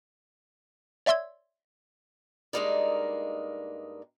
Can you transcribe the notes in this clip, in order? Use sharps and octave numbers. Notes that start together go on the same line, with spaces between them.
C#5 D5 E5 C6 E6 G#6
G2 G#3 A#3 D#4 A#4 D5